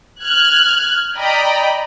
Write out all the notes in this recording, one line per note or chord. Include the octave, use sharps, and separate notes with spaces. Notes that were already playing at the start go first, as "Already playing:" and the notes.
F6 F#6 G#6
D5 D#5 G5 A#5 B5